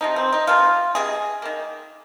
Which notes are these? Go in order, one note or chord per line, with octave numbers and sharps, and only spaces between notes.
C3 F3 G#3 D#4
C4
D#4
C3 F3 A#3 F4
C3 G#3 G#4
D#3 A#3